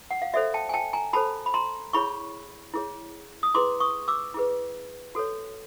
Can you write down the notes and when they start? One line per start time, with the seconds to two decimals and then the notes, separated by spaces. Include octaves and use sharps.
0.11 F#5
0.22 F5
0.34 F#4 A4 C5 D5 E5
0.54 G5 A5
0.69 G#5
0.74 G5 A5
0.93 G#5 A#5
1.13 F#4 A4 C5 A5 B5
1.46 B5
1.54 A#5 C6
1.93 E4 G#4 C#5 B5 C#6
2.74 E4 G#4 C#5
3.43 D#6
3.54 E4 G#4 B4 C6 D6
3.80 C#6 D#6
4.08 D6 E6
4.34 E4 G#4 B4
5.15 F#4 A4 C#5